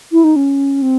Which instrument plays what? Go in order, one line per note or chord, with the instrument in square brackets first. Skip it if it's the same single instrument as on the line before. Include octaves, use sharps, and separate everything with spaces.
[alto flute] E4
D#4
C#4
C4